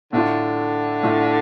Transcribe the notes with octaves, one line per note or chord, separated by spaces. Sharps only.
A2 D3 A3 F4
A2 A3 F4